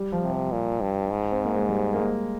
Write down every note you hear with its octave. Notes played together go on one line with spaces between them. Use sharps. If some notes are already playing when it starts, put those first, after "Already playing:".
Already playing: G3
F3
C3
F3
A#2
G2
G#2
C4
A#3
G#3
G3
A#3
G#3